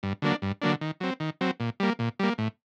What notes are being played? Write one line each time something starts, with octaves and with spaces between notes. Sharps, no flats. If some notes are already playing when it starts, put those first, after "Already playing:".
G2
D3 F#3 A#3 D4
G2
D3 F#3 A#3 D4
D#3
F#3 C4
D#3
F#3 C4
A#2
G3 A#3
A#2
G3 A#3
A2